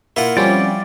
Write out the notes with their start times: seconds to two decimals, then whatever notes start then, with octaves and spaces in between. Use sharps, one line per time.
0.16 A#3 E4 F4 F#5
0.37 F3 G3 C4 C#4 D5